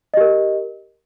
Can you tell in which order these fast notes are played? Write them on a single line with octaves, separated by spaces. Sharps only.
D#5 G4 A#4